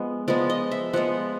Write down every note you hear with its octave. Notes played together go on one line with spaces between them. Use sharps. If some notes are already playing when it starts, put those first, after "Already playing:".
Already playing: F3 G#3 B3
F3 G#3 B3 D5
D#5
E5
F3 G#3 B3 F#5